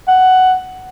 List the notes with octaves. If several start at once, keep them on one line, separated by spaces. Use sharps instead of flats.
F#5